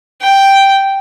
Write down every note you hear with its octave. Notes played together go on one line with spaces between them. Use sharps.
G5